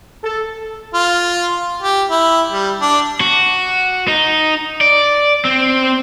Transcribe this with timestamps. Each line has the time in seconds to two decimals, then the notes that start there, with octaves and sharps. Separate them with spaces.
0.24 A4
0.94 F4
1.82 G4
2.10 E4
2.52 G3
2.81 D4
3.20 F#4
4.08 D#4
4.81 D5
5.45 C4